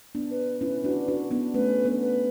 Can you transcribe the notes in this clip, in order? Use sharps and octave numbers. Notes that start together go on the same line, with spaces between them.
B3 D4
B4
C#4 E4
D4 F#4
D4 F#4
B3 D4
A3 C#4 B4
B3 D4
B4